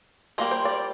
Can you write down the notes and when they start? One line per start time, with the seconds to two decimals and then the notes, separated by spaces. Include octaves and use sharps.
0.38 G3 A#3 D#4 C5
0.51 C5
0.65 D5